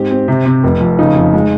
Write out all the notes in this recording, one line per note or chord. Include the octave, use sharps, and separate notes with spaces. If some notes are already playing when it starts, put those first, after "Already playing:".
Already playing: G#2 C4 G4
C4
C3
C3
F1
F2
C#3 D#4
F2
G#3